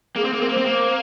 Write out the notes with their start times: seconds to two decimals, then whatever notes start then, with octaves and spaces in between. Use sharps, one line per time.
0.16 A#3 G#4
0.24 C4
0.33 A#3
0.40 C4 A#4
0.49 A#3
0.52 C5
0.57 C4
0.65 A#3